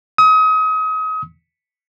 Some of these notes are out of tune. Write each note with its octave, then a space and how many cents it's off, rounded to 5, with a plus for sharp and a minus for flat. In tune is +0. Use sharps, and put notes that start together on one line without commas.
D#6 +35